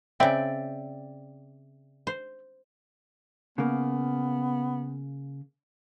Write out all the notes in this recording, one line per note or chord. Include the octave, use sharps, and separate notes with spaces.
C#3 C4 D5 E5 G5
C5
C#3 A#3 B3